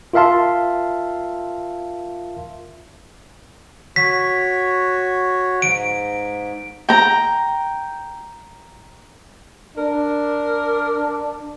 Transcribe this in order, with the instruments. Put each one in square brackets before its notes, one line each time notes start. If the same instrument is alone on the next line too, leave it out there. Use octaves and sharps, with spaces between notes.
[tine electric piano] F4 A#4 E5 F5 A5 C6
[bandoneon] F#4 C#5 [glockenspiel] B6
[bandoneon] G#2 [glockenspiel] D7
[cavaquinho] G5 A#5
[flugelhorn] D4 [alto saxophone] A#4